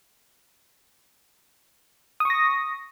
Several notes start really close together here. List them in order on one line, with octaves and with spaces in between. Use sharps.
D#6 C#6 A#6